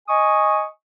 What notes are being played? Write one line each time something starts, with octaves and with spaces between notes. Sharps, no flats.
D#5 G#5 C#6 D#6